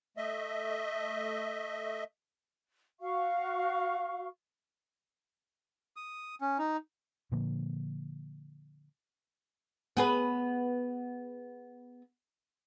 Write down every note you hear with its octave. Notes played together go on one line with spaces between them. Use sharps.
A3 D#5 E5
F#4 F5 C#6
D#6
C#4
D#4
A#2 D3 F3 A#3
B3 G#4 B4